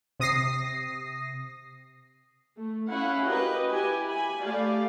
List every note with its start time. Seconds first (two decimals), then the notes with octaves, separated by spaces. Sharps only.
0.20 C3 D#6 A#6 C7
2.58 A3
2.90 C#4 E4 F5 F#5
3.28 F#4 G4 B4 D#5
3.71 E4 G4 G#5
4.05 G#5 B5
4.42 A3 G4 D5 F5